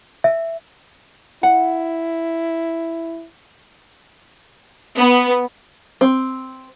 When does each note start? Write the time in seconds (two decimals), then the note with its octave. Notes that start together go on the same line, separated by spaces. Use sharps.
0.24 E5
1.43 E4 F#5
4.98 B3
6.01 C4